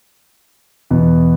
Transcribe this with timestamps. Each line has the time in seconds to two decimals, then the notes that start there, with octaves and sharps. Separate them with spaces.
0.90 E2 B2 B3